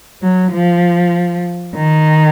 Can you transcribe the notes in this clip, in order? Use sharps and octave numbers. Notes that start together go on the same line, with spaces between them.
F#3
F3
D#3